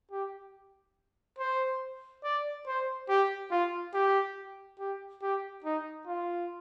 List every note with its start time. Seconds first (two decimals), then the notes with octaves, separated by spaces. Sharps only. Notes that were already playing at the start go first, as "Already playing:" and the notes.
0.11 G4
1.39 C5
2.24 D5
2.67 C5
3.09 G4
3.51 F4
3.94 G4
4.79 G4
5.22 G4
5.64 D#4
6.07 F4